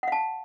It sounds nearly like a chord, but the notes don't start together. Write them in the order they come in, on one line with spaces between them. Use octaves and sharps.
F#5 F5 A5